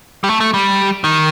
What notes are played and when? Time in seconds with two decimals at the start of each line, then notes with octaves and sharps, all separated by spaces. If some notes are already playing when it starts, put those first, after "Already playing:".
0.24 G3
0.29 A3
0.40 A3
0.54 G3
1.04 D#3